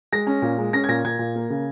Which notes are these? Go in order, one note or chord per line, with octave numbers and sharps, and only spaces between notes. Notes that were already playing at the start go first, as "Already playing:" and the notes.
G#3 A#6
C#4
A#2
G#3
C#4 A#6
G#6
A#2 A#6
A#2 G#6
A#2
A#3
C#3